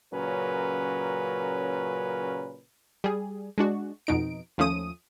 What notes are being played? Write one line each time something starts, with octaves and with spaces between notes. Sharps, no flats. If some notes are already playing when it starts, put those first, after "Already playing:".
A#2 C#3 F#3 C#4 A#4 B4
G3 G#4
G#3 D4 F#4
F2 B2 D#4 D7
D#2 F3 A3 C#4 D#6 D#7